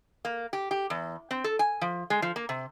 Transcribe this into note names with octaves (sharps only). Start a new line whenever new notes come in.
A#3
G4
G4
E2
C4
A4
G#5
F3
G#3
F3
A#3
C3